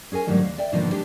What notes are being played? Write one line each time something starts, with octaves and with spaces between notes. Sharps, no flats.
C#4 G#4 A#4 G#5
G#2 D3 D#3 F#3 G3 A3
D#2 F5
D5 E5 G5
G#2 B2 D3 D#3 F3 A#3
G#3 D4 G4 B4 C5